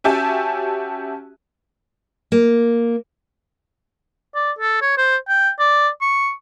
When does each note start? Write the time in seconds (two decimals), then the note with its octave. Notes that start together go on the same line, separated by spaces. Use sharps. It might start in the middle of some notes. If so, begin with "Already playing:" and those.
0.04 C#4 F#4 G4 E5 G#5 A5
2.32 A#3
4.35 D5
4.59 A4
4.82 C#5
4.98 C5
5.29 G5
5.59 D5
6.01 C#6